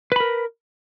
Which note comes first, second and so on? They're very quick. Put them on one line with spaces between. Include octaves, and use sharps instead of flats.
B4 B5 A#4